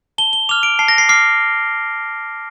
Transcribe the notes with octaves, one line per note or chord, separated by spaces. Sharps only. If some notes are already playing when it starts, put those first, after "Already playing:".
A5 G7
G7
D6 F6 F7
D7
A5 C7
A#6
C7
D6 F6 C7